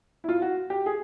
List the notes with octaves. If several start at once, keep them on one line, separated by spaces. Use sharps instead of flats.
E4
F4
F#4
G4
G#4